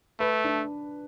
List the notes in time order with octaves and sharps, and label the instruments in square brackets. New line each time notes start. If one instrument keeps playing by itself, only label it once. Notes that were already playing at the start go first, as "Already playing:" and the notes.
[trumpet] A3 [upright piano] B4
[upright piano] D4